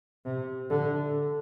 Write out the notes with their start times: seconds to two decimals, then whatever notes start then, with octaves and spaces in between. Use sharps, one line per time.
0.25 C3
0.70 D3